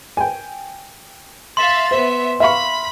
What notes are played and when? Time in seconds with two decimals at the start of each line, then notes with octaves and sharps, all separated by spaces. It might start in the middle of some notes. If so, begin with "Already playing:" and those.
0.17 G5 G#5
1.57 E5 F5 C6 A6
1.91 B3 C5 E5
2.40 E5 F5 B5 C#6